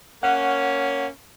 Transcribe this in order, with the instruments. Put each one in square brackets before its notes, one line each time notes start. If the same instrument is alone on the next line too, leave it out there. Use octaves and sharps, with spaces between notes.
[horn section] A#3 C#4 [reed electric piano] F#5